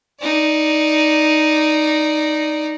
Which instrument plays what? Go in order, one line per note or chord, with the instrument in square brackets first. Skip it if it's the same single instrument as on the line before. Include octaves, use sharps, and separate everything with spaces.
[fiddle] D#4 D5